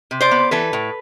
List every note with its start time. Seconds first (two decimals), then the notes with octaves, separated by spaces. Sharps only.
0.11 C3
0.21 C5 D5
0.31 B3
0.51 E3 A4 B4
0.73 A2